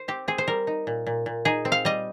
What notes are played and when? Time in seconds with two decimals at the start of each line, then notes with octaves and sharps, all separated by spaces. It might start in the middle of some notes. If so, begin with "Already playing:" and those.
Already playing: C5
0.08 C4 G4
0.28 C4 G#4
0.38 C5
0.47 G3 A#4
0.67 D#4
0.87 A#2
1.07 A#2
1.26 A#2
1.45 D#4 G#4
1.65 C4
1.72 F5
1.85 G3 D#5